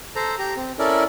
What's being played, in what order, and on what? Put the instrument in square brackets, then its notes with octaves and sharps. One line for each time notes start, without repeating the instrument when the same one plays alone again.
[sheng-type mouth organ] A4 C5 A#5
G4 A#5
C4
C#4 E4 A4 A#4 D5